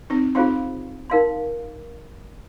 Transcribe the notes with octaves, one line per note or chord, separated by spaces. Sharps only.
C4 D#4
C4 D#4 F4 G#4 C5 F5 C6
D#4 A#4 F5 C6